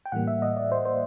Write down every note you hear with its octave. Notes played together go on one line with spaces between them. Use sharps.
G5
A2 E3 G3 A#3 F#5
E5
D#5
D5
C5
C5